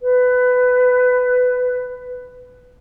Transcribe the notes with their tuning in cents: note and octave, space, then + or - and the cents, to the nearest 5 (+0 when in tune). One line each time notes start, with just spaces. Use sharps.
B4 +15